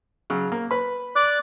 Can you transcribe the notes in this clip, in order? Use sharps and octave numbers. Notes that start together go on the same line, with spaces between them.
C#3 F#3
A#3
B4 B5
D5 D6 F#6